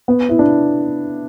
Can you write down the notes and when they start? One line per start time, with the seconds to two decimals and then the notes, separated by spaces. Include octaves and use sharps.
0.08 B3
0.29 E4
0.39 D4